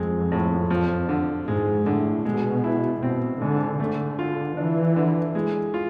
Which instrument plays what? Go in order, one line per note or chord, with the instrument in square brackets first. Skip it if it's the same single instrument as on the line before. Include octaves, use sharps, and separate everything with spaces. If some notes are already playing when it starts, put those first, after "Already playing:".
Already playing: [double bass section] F2 [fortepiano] G#3 C4
[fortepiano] A2
F3
D3
[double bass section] G#2 [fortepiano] G#3
[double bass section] A2 [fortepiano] D3
[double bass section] B2 [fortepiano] G#3
[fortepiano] E4
[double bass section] B2 [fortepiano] C4
[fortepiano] G#2 [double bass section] D3
[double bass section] D3 [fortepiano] A3
[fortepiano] F4
[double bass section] E3 [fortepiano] D4
[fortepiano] D3
G#3
F4